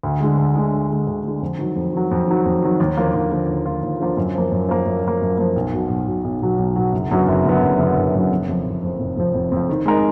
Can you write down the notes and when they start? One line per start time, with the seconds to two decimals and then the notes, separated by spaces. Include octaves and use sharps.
0.03 D2
0.20 D3 G#3
0.38 D2
0.55 D3 G#3
0.73 D2
0.91 D3 G#3
1.07 D2
1.24 D3 G#3
1.42 F2
1.59 D#3 F#3
1.76 F2
1.93 D#3 F#3
2.11 F2
2.27 D#3 F#3
2.45 F2
2.63 D#3 F#3
2.80 D#2
2.97 D3 F3 A#3 F4
3.14 D#2
3.31 D3 F3 A#3 F4
3.49 D#2
3.66 D3 F3 A#3 F4
3.83 D#2
4.00 D3 F3 A#3 F4
4.17 F#2
4.35 F3 A#3
4.51 F#2
4.69 F3 A#3
4.86 F#2
5.04 F3 A#3
5.21 F#2
5.38 F3 A#3
5.56 B1
5.73 B2 F#3
5.89 B1
6.06 B2 F#3
6.24 B1
6.42 B2 F#3
6.59 B1
6.76 B2 F#3
6.93 F#1
7.11 F#2 D3 F#3 B3
7.28 F#1
7.45 F#2 D3 F#3 B3
7.62 F#1
7.79 F#2 D3 F#3 B3
7.96 F#1
8.14 F#2 D3 F#3 B3
8.31 F1
8.48 F2 F3
8.66 F1
8.83 F2 F3
9.00 F1
9.17 F2 F3
9.35 F1
9.52 F2 F3
9.69 D#3
9.86 G#3 D#4 A#4 D#5